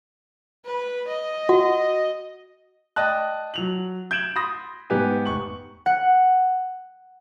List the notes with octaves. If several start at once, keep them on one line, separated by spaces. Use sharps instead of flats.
B4
D#5
F#4 F#5
D5 D#5 G5 A5 F#6
F#3 F7 F#7
G6 G#6 D7 E7 F#7
B5 C6 D#6 A#6
G#2 B3 G4 B4 G#5
F1 C#6 F#7
F#5